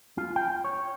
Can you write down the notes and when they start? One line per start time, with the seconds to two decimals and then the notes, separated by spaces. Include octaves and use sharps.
0.18 F4
0.36 G5
0.64 C#5